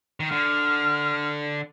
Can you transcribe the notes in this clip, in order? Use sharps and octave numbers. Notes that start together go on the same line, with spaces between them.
D#3
D3 F6